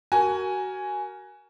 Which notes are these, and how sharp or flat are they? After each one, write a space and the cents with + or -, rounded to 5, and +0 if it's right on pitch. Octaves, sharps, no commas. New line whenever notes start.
F#4 +20 A#4 +0 G#5 +0